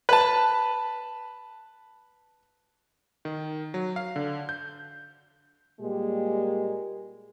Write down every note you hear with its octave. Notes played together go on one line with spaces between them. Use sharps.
B4 A5
D#3
F#3
F5
D3
G6
A#2 G3 G#3 A#3 G4